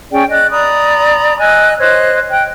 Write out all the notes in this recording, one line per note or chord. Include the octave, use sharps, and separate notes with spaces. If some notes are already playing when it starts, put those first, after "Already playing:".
C#4 G#4 D5 G5
D5 D#5 F#6
D5 A#5 B5 D#6
D#5 G#5 E6 F#6
C5 C#5 D#5 F#6
G5 F#6